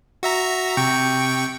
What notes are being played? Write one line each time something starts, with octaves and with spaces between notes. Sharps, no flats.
F#4 E5 A#5
C3 G5 C#6